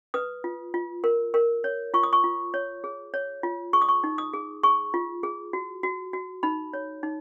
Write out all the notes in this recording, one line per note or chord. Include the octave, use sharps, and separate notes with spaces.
B4 D#6
F4
F4
A#4
A#4
C#5
F4 C#6
D#6
C#6
F4
C#5
G#4
C#5
F4
G#4 C#6
D#6
C#6
D#4
D#6
G#4
G#4 C#6
F4
G#4
F#4
F#4
F#4
D#4 B5
C#5
D#4